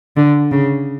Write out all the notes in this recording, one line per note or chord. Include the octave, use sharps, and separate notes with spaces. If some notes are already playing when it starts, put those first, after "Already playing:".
D3
C#3